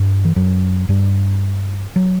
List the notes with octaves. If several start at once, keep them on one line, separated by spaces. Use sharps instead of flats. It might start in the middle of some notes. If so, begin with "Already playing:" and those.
Already playing: G2
E3
F#2 F#3
G2 G3
F#3